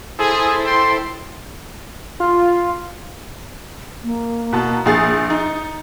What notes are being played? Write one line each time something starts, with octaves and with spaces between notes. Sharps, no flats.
E4 G#4 A4 C5
G5 C6
F4
A#3
B2 A5
A#1 G#4 A6
D#4